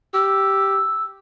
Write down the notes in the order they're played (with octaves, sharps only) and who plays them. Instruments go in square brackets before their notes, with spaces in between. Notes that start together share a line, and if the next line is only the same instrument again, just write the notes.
[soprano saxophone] G4 [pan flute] E6